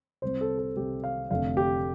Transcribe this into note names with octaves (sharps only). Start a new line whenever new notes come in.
C2 C3 G3 C5
A4
A4
C2 C3 G3 G4
F5
F1 F2 D3 A3 F5
G4